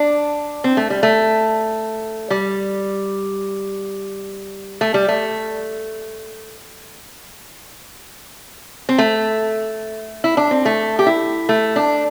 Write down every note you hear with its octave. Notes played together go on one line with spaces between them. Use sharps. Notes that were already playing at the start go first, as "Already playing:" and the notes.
Already playing: D4
C4
A3
G3
A3
G3
A3
G3
A3
C4
A3
E4
D4
C4
A3
G4
E4
A3
D4